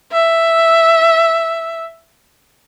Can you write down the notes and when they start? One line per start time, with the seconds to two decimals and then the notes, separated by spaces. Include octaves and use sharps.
0.12 E5